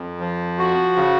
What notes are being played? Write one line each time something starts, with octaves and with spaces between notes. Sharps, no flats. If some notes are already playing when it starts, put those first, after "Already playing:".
Already playing: F2
F3
F#4
C#3